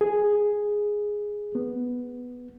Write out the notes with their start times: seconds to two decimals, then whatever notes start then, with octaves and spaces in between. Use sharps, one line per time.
0.01 G#4
1.55 B3